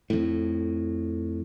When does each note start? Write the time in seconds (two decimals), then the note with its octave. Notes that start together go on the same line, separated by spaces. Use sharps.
0.10 F2 A2